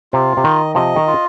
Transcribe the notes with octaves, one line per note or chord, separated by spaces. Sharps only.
C3 F4
C3
D#3 D#5
C3 F3 D#5
D#3
F4